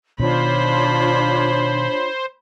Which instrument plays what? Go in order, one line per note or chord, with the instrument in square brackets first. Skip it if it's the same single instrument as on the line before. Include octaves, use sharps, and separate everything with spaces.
[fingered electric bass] B2 D#3 [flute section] D4 F4 C#5 [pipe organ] C5 [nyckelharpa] B5